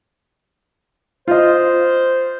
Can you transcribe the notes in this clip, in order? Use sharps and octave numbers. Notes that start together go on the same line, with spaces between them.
F4 C5 D#5